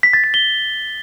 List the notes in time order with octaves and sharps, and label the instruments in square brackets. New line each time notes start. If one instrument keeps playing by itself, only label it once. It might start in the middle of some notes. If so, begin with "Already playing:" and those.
[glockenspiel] B6
A6
B6
G7